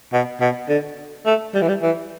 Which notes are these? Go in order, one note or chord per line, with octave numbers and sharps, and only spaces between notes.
B2
B2
D3
A3
G3
E3
G3
E3